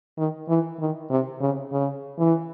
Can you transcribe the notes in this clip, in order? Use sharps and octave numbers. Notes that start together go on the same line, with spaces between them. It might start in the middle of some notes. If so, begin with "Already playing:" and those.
D#3
E3
D#3
C3
C#3
C#3
E3